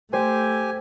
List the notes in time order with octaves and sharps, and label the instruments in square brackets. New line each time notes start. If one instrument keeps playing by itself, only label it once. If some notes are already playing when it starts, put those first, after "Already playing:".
[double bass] A3 [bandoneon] G4 G#5 [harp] C5